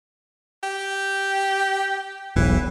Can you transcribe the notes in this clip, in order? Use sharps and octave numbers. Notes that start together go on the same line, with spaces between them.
G4
E1 B1 E3